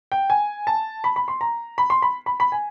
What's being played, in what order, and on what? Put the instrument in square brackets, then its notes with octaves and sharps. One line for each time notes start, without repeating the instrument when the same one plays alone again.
[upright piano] G5
G#5
A5
B5
B5
C6
A#5
B5
C6
B5
B5
B5
G#5